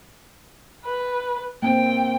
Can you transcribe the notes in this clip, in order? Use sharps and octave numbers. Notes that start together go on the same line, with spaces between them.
B4
A#3 C4 G5